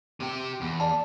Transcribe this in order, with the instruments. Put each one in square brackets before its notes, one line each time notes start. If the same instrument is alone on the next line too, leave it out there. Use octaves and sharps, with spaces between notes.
[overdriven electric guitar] C3 G4
E2
[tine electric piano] D5 A5